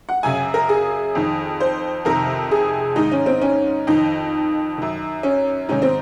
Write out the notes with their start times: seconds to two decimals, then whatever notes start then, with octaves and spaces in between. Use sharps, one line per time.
0.09 F#5
0.23 F#2 C#3 G#5
0.54 A#4
0.69 G#4
1.15 F2 D#3
1.60 C5
2.05 F2 C3 D#3 A#4
2.51 G#4
2.96 G#2 D#3 D#4
3.12 C#4
3.26 C4
3.41 C#4
3.87 F2 D#3 D#4
4.78 F#2 D#3
5.23 C#4
5.69 G#2 D#3 C#4
5.82 C4